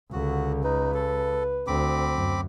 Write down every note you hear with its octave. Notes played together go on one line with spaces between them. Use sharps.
C#2 D3 F#4
D#4 B4
A4
D2 C4 B5 D6
F#2